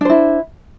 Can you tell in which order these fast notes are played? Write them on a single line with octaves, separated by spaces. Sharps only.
D4 C5 E4